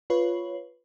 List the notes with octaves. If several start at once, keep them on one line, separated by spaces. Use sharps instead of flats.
F4 B4 C#5